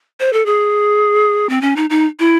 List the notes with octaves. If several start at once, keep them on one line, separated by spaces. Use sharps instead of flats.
C5
A4
G#4
C4
C#4
D#4
D#4
E4